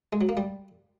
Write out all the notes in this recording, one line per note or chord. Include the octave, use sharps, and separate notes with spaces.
G#3
F#3
A#3
G3